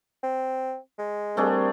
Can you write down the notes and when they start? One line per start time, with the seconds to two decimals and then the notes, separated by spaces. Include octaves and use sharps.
0.23 C4
0.98 G#3
1.37 G3 A3 C4 D4 G#4 A#4